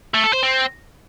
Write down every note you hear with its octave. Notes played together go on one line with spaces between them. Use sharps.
A3
A4
C5
C4